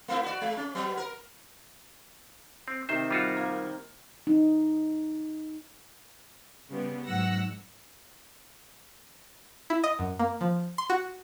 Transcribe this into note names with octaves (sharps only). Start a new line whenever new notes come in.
A3 B3 E4
F#4 D5
G#3
C#4
F#3 B3
A#4
C4
C3 D#3 C5
G3 F4 F#4
A#3
D#4
C#3 G3 G#3 B3
G#2 F#3 F#5 E6 F#6 A#6
E4
D#5
F#2
A#3
F3
C6
F#4